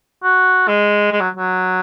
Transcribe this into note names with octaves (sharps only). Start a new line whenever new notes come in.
F#4
G#3
G#3
F#3
F#3